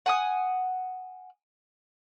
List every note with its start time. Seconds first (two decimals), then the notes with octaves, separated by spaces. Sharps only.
0.06 F#5 G#5 D#6